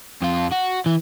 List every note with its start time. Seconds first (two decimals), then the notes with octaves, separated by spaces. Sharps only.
0.22 F2 F4
0.52 F#4
0.86 E3